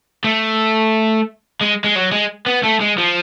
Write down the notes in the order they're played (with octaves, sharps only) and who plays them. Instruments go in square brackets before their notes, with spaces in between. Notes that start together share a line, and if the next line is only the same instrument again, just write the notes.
[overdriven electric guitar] A3
G#3
G#3
F#3
G#3
B3
A3
G#3
F3